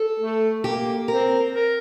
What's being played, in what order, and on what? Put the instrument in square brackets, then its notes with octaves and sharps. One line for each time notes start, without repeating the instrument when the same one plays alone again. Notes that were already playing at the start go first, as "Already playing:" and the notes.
Already playing: [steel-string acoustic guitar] A4
[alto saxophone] A3
[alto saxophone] A#3 [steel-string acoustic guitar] G4
[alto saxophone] C4 [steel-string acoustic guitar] A#4
[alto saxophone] A#4